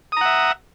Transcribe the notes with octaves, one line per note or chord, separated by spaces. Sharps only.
E5 F#5 A#5 D#6